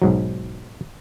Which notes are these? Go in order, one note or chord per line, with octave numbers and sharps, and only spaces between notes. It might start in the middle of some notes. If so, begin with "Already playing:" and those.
B1 G#2 F#3